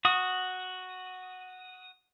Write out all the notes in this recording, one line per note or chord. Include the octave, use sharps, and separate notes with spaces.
F#4 D#6